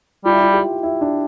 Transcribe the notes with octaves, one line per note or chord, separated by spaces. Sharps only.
G3 F4
E4
F4
G4
E4
D4